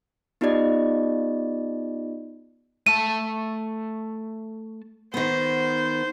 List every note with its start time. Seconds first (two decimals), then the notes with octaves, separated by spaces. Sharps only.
0.41 B3 D#4 F4 G4 D5 D#5
2.86 A3 A5 D#7
5.14 D#3 B3 C5